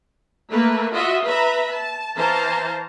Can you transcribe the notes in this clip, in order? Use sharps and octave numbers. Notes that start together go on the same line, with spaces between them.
A3 A#3 A#4 B4
F4 F#4 D#5 E5
B4 E5 A#5 B5
A5
E3 C5 F5 A5 A#5